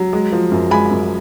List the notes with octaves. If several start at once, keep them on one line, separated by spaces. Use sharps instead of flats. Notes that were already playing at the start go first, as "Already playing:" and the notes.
Already playing: F#3
G#3
F3
F#2
G#3 G#5 B5
F#2